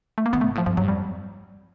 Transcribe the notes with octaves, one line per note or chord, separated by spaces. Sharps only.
A3
A#3
D#3 B3
A3
G#2
A2 F3
G2 F3
G2 F#3
F2 G3